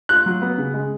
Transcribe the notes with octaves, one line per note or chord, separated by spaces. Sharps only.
F4 F#6
F#3
B3
C#3
G#3